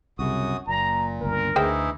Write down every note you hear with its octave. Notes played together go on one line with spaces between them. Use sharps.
C2 F#2 C#3 F#4 D#6
F#1 A#2 A#5
G1 C#2 A#4
D2 E3 D#4 E4 G#4 C5 G5